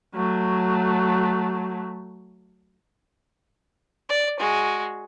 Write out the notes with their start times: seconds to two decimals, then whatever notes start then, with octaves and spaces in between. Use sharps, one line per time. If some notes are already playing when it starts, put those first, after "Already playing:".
0.15 F#3 A3
4.09 D5
4.39 G#3 F#4